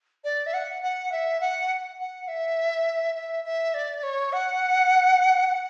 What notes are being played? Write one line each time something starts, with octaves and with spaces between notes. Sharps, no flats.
D5
E5
F#5
F#5
E5
F#5
F#5
E5
E5
E5
D5
C#5
F#5
F#5